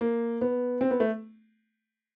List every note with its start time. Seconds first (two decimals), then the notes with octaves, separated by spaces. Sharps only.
0.01 A#3
0.41 B3
0.81 C4
0.91 B3
1.00 A3